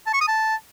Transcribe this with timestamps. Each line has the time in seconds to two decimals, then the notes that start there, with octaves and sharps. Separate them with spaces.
0.06 A5
0.13 C#6
0.21 D#6
0.28 A5